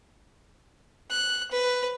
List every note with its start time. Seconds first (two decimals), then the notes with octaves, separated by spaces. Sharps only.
1.10 F#6
1.52 B4